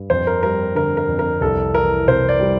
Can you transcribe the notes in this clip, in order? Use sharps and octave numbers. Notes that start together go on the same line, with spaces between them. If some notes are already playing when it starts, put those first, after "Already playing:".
Already playing: G2
F2 C5
A#4
G3 A#4
D3 A#4
A#4
F2
A#4
C2 A4
E3 A#4
C3 C5
D5
G3